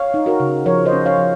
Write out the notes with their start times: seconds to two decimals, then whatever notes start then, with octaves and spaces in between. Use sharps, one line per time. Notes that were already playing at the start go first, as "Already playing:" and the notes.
Already playing: C#5 F5
0.14 D#4
0.26 F#4 A#4
0.40 C#3
0.66 F3 A#4 C#5
0.86 C5 D#5
0.93 C#4
1.06 C#5 F5
1.18 F3